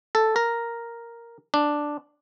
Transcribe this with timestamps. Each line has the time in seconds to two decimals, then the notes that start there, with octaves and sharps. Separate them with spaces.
0.15 A4
0.36 A#4
1.54 D4